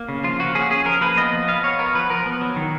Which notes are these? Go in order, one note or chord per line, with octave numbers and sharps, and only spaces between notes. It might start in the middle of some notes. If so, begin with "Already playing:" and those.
Already playing: A#3
C#3
F3 F4
A#3 F#4
C#4 G#4
C#4 G#4
F3 A#4
A#3 B4
B3 D#5
F3
B3 F5
B3 C#5
B3 A#4
F3 B4
F3 A#4
B3
F#3
D#3